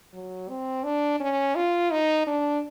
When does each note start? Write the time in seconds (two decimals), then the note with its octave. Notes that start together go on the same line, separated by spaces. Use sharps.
0.14 F#3
0.49 C4
0.84 D4
1.20 C#4
1.56 F4
1.91 D#4
2.27 D4